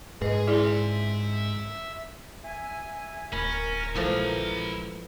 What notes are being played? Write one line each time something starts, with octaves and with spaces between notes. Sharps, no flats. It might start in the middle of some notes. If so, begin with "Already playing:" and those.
G#2 G#4 B4 D#5
E4 G#4 D5 E5 C6
E5 G#5
D1 C#4 A#4 B5
A#1 E3 F3 G#3 A3 E4 A#5